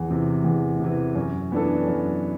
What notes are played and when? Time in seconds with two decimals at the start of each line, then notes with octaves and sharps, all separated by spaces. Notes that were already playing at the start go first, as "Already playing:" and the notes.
Already playing: E2
0.08 C3 E3
0.44 E2
0.80 C3 E3
1.15 F#2
1.51 E3 B3 D4 A4
1.87 F#2